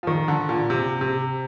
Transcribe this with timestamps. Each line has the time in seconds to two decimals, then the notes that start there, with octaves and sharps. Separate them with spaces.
0.03 F3
0.07 D#3
0.28 D3
0.49 A#2
0.70 C3
1.01 C3